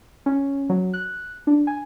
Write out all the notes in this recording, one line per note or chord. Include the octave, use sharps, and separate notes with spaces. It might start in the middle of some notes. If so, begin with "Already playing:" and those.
C#4
F#3
F#6
D4
G#5